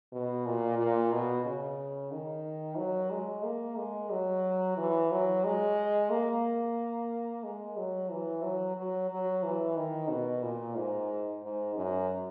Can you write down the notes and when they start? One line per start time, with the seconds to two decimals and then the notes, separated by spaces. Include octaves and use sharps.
0.12 B2
0.46 A#2
0.79 A#2
1.12 B2
1.45 C#3
2.11 D#3
2.77 F#3
3.11 G#3
3.44 A#3
3.77 G#3
4.11 F#3
4.77 E3
5.11 F#3
5.44 G#3
6.10 A#3
7.43 G#3
7.77 F#3
8.10 E3
8.43 F#3
8.77 F#3
9.10 F#3
9.43 E3
9.76 D#3
10.10 B2
10.42 A#2
10.76 G#2
11.43 G#2
11.76 F#2